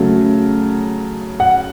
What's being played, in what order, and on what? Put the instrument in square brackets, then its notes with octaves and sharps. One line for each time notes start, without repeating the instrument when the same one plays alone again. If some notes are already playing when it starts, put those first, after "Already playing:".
Already playing: [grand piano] C#3 F#3 A3
F#5